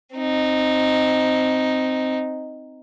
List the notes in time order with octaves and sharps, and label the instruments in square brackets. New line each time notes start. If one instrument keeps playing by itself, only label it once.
[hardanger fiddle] C4 D#4